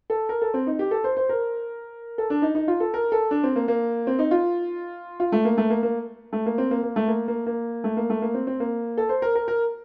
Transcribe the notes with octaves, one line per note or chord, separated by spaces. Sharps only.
A4
A#4
A4
C4
D#4
G4
A4
C5
C5
A#4
A4
D4
D#4
D#4
F4
A4
A#4
A4
D4
C4
A#3
A#3
C4
D#4
F4
F4
A3
A#3
A3
A#3
A#3
A3
A#3
C4
A#3
A#3
A3
A#3
A#3
A#3
A3
A#3
A3
A#3
C4
C4
A#3
A4
C5
A#4
A#4
A#4